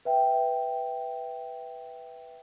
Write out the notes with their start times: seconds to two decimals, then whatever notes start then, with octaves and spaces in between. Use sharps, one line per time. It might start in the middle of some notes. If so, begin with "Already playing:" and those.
0.05 B4 E5 G5